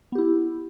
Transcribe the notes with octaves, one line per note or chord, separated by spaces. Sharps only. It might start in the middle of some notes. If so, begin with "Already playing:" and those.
B3 E4 G4